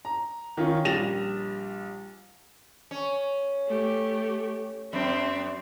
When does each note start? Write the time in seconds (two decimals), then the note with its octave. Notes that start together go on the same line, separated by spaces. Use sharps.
0.05 A#5
0.57 D#3 C#4 F4
0.85 A#1 G3 A6 A#6 E7 F7
2.91 C#4
3.67 A3 G4
4.93 F#2 C4 E5